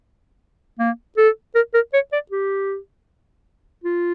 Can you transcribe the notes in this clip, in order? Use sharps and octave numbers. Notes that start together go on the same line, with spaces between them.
A#3
A4
A#4
A#4
C#5
D5
G4
F4